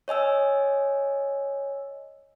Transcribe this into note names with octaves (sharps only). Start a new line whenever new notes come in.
C#5 D#5 G#5 E6